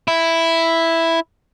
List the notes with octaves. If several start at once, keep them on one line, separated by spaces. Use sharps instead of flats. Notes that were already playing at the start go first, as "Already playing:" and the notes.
E4